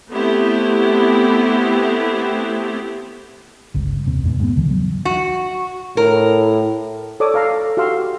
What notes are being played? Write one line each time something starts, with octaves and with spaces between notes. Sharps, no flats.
A3 B3 C4 E4 G4
G1 C#2
D#2 C3
E2 G#2 B2
G#2 B3
D#1 C#2 D3 E3
F#3
F#4
A2 A#4
A4 C#5 D5 D6 D#6
A4 F5 A#5
F#4 G4 F5 C6 E6